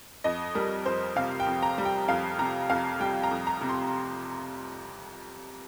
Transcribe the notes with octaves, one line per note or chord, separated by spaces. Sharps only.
F2 D#5
G3 A#4
F2 C5
C3 F5
G5
F2
A#5
G3
G5
F2 F5
C3 A#5
F2 F5
G3 G5
A#5
F2
A#5
C3
C6